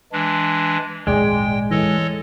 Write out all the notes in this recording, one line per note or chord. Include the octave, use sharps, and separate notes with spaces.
E3 G#3 D4
D#1 G#1 D#2 G#3 G#4 D5 G5
E3 A4 C#5 D#5